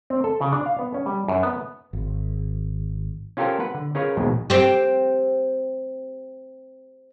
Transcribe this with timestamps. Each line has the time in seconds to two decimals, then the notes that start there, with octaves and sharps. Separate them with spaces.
0.10 C4
0.24 A4
0.41 C#3
0.52 D4
0.66 F5
0.79 B3
0.94 C#4
1.06 G3
1.28 F#2
1.43 B3
1.93 G#1
3.37 C#4 F4 G4 A4 A#4 C5
3.60 B4 F#5
3.74 D3
3.95 C#4 F4 G#4 A#4 B4 C#5
4.17 A#1 D#2 B2 G#3
4.50 C4 G4